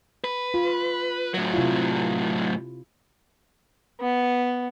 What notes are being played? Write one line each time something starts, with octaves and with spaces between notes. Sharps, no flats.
B4
F4
A2 F#3
C3 E4 F4
B3